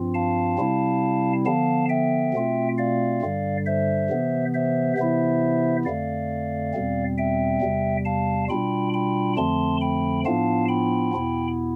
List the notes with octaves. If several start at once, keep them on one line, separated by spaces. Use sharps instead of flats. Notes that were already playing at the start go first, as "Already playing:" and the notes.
Already playing: G2 F3 C4 F4
F5 A5
C3 G3 C4 E4
D3 F3 B3 F5 A5
E5 G5
B2 A3 C4 F4
D5 F5
G2 D3 G3
C5 E5
C3 E3 B3
C5 E5
C3 E3 B3 E4 C5 E5
F2 D3 A3 D5 F5
E2 B2 G3 C4
E5 G5
E2 C3 G3
F5 A5
B2 G3 D4 F4 G5 B5
G5 B5
F2 D3 F3 A3 C4 A5 C6
G5 B5
A2 F3 B3 D4 F4 F5 A5
G5 B5
E2 B2 B3 E4